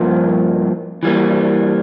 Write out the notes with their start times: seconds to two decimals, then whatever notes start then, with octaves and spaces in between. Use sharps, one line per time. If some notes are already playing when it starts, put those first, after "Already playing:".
Already playing: G2 F3 A#3
1.03 E3 G3 A#3